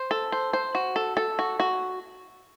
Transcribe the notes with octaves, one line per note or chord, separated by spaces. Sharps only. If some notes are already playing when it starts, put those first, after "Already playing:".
Already playing: C5
A4
C5
C5
F#4
A4
A4
F#4
F#4